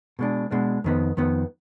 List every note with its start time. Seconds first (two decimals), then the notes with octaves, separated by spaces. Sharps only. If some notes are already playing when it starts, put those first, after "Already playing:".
0.19 B2 G#3 D4
0.51 B2 G#3 D4
0.84 F2 D#3 B3
1.17 F2 D#3 B3